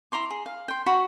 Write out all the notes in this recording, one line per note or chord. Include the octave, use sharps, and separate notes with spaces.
E4 A#5 C6 D6
G#4
F5
G5 C6
F#4 B5